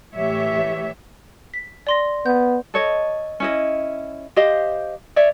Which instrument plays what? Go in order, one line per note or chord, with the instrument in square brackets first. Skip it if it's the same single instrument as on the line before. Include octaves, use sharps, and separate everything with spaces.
[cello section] A2 E3 G4 C#5 E5
[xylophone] B6
D5 C6 A#6
[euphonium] B3 [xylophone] G6
[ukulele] A4 C#5 D#5
C#4 E4 D#5
G4 C5 D#5 F5
C#5 D5 E5